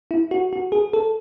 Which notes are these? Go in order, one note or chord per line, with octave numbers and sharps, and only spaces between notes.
E4
F#4
F#4
G#4
A4